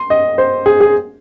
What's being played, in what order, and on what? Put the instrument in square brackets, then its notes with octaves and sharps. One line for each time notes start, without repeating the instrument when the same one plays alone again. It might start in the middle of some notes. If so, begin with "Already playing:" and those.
Already playing: [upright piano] C6
D#5
C5
G#4
G#4